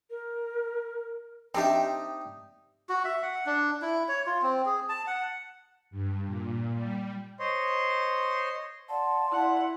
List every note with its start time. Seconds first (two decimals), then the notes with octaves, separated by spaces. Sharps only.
0.10 A#4
1.54 C4 D4 D#4 G4 D#5 E5
2.89 F#4
3.05 E5
3.22 F#5
3.46 D4
3.82 E4
4.08 C#5
4.26 F4
4.42 C4
4.66 G#4
4.89 A5
5.07 F#5
5.91 G2
6.26 A#2
6.73 G3
7.40 C5 C#5 D#5 C6
8.89 D5 F5 F#5 A5 C6
9.31 E4 F#5